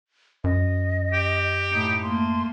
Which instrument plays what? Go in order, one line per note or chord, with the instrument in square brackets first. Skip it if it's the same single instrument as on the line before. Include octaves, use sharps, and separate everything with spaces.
[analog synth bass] F#2 [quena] D#5
[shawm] G4
[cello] A2 D#4
[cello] A3 A#3 [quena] C6